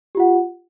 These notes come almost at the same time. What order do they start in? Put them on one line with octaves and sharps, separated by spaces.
G4 F4 F#5